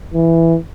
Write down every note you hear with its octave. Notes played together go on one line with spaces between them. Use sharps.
E3